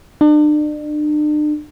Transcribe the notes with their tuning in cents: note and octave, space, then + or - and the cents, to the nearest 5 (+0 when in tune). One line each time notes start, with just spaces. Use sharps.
D4 +40